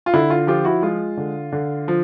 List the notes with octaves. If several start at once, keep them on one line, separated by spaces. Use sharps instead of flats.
F4
D3 E4
F4
F3 F4 G4
E4 F#4
G#3 F4
D3
D3
F3